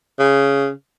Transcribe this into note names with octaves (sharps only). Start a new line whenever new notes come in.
C#3